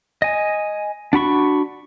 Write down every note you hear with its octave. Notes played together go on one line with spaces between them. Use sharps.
D#5 G#5
D4 F#4 B5 C#6